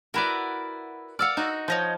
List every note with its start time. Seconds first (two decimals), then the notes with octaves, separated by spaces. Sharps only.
0.14 E4 F#4 A#4 B4 D5
1.19 D5 F5 F#5 E6 F6
1.37 D#4 F#4
1.68 F3 C#5 D#5 G6